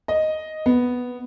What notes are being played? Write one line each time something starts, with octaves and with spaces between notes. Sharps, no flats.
D#5
B3